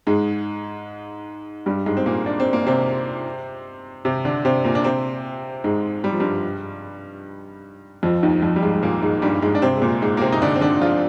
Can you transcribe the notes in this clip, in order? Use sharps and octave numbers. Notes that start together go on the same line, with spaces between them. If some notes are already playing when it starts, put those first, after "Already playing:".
G#2 G#3
G2 G3
G#2 G#3
C4
A#2 A#3
D4
C4
A#3
C3 C4
C3 C4
D3 D4
C3 C4
A#2 A#3
D4
C3 C4
G#2 G#3
G3
F3
G2 G3
F2 F3
D#2 D#3
F2 F3
G3
G#2 G#3
G#3
A#2 A#3
G#2 G#3
G2 G3
G#2 G#3
D4
C3 C4
G#3
A#2 A#3
G#2 G#3
A#3
C3 C4
D#4
D3 D4
C4
D3 D4
F3 F4